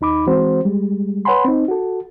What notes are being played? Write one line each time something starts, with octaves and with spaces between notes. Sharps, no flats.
D#2 D#4 B5 D6
E3 G#3 C4 F#4 C5
G3 G#3
B4 C#5 F#5 G#5 B5 C6
C4 D#4
F#4 A4